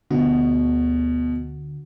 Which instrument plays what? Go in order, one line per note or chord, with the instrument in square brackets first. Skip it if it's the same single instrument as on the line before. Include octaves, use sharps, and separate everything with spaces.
[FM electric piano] D2 D3 F#4 [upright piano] B2